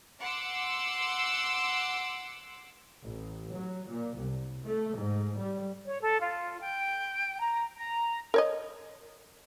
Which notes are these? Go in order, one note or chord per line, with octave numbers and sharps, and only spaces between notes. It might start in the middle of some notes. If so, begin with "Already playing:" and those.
F#5 C6 D6 E6
A1
F#3
A#2
C2
A3
G#2
G3
C#5
A4
F4
G5
A#5
A#5
A#4 C#5 D#5